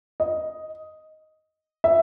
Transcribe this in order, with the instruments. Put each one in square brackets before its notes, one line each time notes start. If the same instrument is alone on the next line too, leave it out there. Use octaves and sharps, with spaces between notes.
[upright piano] D#5
E5